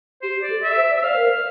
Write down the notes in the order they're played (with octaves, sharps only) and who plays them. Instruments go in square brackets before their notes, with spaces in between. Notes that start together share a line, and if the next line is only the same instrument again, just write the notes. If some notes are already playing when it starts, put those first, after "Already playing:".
[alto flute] G4 [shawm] C5
[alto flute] G4
[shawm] D5
[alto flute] A4
[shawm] E5
[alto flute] C5
D5
[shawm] E5
[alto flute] C5 [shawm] F5
[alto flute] A#4
C5